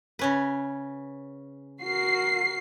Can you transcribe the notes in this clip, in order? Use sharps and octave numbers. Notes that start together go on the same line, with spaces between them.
C#3 C#4 B4
F#4 A#4 C7